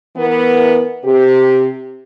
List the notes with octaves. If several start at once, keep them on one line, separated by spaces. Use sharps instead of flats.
E3 B3 A#4
C3 G4